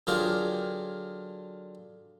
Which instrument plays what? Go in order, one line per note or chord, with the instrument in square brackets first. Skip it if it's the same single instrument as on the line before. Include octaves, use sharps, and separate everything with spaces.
[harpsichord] D3 F#3 F4 G4 G#4 A#4